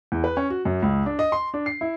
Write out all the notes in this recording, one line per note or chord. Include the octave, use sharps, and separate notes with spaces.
E2
B4
C#4
F#4
F#2
C#2
D4
D#5
C6
D4
C7
E4